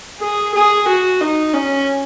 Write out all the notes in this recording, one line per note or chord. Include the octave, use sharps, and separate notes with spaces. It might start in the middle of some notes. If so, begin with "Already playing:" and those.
G#4
G#4
F#4
D#4
C#4